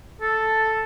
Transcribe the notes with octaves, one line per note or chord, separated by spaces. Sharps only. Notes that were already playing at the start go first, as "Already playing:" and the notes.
A4